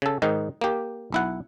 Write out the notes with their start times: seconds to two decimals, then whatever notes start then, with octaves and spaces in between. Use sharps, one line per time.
0.02 C#3 A4
0.22 G#2 D#3 D#4
0.61 A#3 G4
1.12 B1 E4 F#5